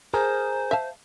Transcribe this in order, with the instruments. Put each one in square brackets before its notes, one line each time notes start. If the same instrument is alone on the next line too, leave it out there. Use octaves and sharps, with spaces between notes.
[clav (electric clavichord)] G#4 A#4 [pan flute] C5
[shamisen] E5 F5 A5